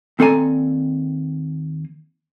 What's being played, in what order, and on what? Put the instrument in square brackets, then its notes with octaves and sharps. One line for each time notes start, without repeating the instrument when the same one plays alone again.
[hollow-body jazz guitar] D#2 C4 A4 D5 G#5 A#5